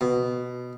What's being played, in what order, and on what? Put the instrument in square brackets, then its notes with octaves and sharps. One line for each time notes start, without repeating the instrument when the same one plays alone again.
[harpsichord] B2